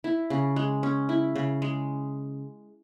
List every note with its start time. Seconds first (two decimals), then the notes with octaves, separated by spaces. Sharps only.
0.04 E4
0.30 C#3
0.56 G#3
0.83 C#4
1.09 E4
1.36 C#3
1.62 G#3